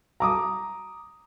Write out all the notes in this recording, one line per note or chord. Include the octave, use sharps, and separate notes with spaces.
A#5 D6 D#6